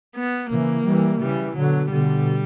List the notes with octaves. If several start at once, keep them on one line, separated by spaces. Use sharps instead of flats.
B3
C#3 E3 A#3
E3 G3
C#3 E3 G3
B2 D3 F#3
B2 D3 G3